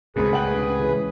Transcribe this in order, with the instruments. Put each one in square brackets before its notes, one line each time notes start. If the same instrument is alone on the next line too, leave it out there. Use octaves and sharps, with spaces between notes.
[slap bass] C#2 A2 [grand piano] C#3 A#3 C4 [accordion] G#4 B4
[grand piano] F#5 G5 F#7
C#3 D4
C#3 E3 C#4